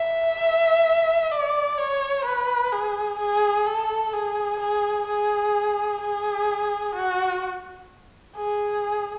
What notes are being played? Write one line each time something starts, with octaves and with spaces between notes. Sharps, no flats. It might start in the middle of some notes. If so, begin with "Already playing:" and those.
Already playing: E5
D5
C#5
B4
G#4
G#4
A4
G#4
G#4
G#4
G#4
F#4
G#4